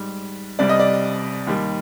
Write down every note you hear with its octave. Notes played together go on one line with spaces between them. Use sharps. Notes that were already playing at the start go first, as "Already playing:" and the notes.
Already playing: G#2 G3
C2 C3 G3 D5
D#5
D5
D#2 D#3 G3